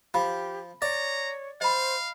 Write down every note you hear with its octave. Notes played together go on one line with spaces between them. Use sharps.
F3 G4 B5
C#5 D5 A#5
C5 D#5 F5 B5